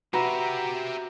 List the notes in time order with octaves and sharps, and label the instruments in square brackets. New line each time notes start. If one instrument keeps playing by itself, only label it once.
[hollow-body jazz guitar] F#4 B4 [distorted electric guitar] G4 E5 [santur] A#5